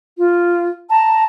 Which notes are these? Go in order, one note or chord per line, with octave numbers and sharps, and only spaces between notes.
F4
A5 A#5